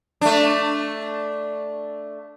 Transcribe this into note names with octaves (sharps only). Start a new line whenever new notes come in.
A3 D4